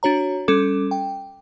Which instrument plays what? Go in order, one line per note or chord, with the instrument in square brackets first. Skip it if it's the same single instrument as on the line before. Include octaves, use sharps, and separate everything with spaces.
[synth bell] D4 F#4 C#5 A#5
G3 C#4 A4 D6
G5